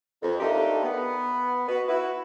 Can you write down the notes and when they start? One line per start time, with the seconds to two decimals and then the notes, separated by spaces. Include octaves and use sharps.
0.22 F2
0.40 A3 A#3 D4 D#4 G4
0.83 B3
1.67 B3 F#4 B4
1.87 E4 F#4 B4